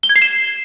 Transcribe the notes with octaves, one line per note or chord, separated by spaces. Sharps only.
G7
G#6
C7
E7